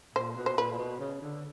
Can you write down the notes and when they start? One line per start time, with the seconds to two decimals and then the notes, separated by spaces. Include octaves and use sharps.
0.15 A#2 C5
0.36 B2
0.46 C5
0.58 A#2 B4
0.71 A#2
0.78 B2
0.99 C#3
1.22 D3